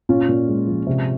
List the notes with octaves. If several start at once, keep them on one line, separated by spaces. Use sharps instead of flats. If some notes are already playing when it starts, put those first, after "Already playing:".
A#2 C#4 F4
A#2
G#3
F3
C3